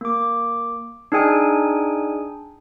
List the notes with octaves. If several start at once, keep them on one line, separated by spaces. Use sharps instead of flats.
A#3 D6
D4 D#4 G#4 G5 G#5